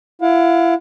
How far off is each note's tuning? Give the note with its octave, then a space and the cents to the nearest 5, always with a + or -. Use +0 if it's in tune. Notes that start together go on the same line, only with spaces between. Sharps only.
E4 +35 F5 +40